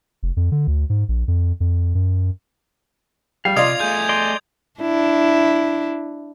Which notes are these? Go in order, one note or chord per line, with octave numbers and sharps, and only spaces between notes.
F1
F2
D3
D2
G#2
A#1
F2
F2
F#2
G3 F5
C3 F4 D5 D#5 D#6 G#6 F7
A3 G#4 G6
D5 D#5 C6
D4 E4